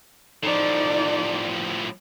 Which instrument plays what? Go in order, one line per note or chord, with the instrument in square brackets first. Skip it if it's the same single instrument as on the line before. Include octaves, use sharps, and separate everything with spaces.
[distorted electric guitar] A2 F3 [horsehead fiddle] D#4 D5